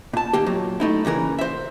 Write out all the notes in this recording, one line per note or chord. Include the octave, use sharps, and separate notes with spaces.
A#2 A5
D#2 A#3 G4
A#2 F#3
A3 D#4 E4
A#2 C#3 E3 A#4
C5 E5